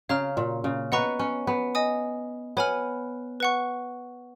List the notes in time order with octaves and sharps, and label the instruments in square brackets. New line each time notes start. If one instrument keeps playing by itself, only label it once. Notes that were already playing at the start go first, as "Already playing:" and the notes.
[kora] C#3 [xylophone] C#5 F5 A#5 F6
[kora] A#2
C#3
[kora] B3 [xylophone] D#5 F#5 A#5 C#6 F#6
[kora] C#4
B3
[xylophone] D#5 G#5 D#6
[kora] B3 [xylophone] C#5 G#5 B5 F6
[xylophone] B4 F#5 C#6